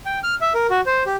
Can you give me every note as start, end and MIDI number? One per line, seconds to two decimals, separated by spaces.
0.06 0.19 79
0.24 0.35 89
0.41 0.53 76
0.54 0.67 70
0.70 0.81 66
0.86 1.03 72
1.06 1.16 67